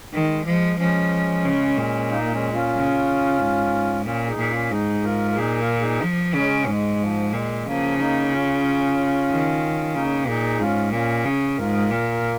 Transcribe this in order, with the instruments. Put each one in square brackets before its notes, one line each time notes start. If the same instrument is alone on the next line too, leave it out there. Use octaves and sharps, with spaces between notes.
[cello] D#3 [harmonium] G#3
[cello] F3 [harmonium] G#3
[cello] F3 [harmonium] G#3 C#4
[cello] C#3
A#2
[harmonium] A#3 D#4
A#3
G#3 C#4
C#4 F4
[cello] C#3
G#2
[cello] A#2 [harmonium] C#4 F4
[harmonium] D#4 G#4
[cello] A#2
[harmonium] C#4 F4
[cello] G#2 [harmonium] D#4 G#4
[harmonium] F4 A#4
A#4
[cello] A#2 [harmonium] D#4 G#4
[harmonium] F4 A#4
D#4 G#4
[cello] F3
[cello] C#3 [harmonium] G#3 C#4
[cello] G#2 [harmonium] G#3
[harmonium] F3
[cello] A#2 [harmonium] G#3
[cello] C#3 [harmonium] F3 A#3
[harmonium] A#3 D#4
C#4 F4
[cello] D#3
[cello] C#3 [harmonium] A#3 D#4
[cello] A#2 [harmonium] D#4 G#4
[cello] G#2 [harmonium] C#4 F4
[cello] A#2 [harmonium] C#4 F4
[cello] C#3
[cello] G#2 [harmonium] F4 A#4
[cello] A#2